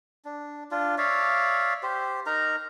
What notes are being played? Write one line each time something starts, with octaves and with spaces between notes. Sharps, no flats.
D4
D4 F4
C#5 D5 E5 F5
G4 C5
D#4 A#4 A#5